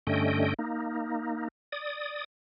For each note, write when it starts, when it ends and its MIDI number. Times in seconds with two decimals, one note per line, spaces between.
0.07 0.54 43
0.07 0.54 50
0.07 0.54 57
0.07 0.54 61
0.07 0.54 75
0.07 0.54 79
0.59 1.48 58
0.59 1.48 63
1.72 2.24 74
1.72 2.24 87